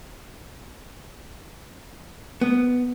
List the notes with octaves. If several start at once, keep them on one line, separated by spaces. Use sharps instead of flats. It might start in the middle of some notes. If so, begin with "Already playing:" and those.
B3